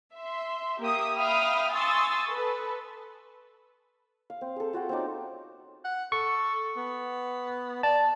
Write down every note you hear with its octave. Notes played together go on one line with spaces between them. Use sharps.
E5 C6
A#3 G4 E5 D#6
E5 F5 G5 B5 D#6 F6
G#5 C6 C#6 D#6 E6 A6
A4 B4
F5
C4
G#4 A4
F4 F#4 F#5 G5
C4 C#4 D#4 D5
F#5
A4 C#6
B3
D5 A5